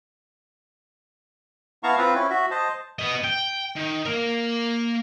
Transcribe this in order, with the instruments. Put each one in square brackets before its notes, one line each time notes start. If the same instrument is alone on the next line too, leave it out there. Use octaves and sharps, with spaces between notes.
[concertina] B3 E4 F5 A5 A#5 C#6
C4 F4 B4
C#4 E4
F#4 E5
C5 D#5 A5
[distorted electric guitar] B3 D#5
G5
D#3
A#3 A#4